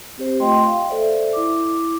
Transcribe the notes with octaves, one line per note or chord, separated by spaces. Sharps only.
C4 G4 C5
A3 F4 D#5 G5 C6
F5 G5
A4 C5 D5 E5
E4 D6